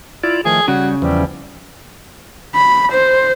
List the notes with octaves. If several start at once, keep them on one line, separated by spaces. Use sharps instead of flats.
E4 F4 D5
D#3 F3 A3 G#4
C#3 G3 F#4
E2 E3 F3 G3
B5
C5